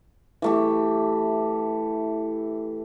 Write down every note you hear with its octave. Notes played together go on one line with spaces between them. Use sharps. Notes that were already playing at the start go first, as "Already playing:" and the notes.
E3 A3 G4